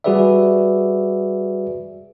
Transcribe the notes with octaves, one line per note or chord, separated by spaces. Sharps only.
G3 F#4 G#4 B4 D5 E5